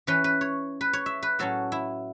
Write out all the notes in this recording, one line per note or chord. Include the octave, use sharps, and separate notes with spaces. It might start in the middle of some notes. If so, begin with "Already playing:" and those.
E3 C#4 B4
B4
C#5
B4
C#5
E5
B4
A2 F#3 C#4 A4
E4